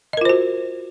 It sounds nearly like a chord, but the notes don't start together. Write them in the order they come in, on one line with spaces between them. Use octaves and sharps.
D#5 A#4 F4 C5 F#4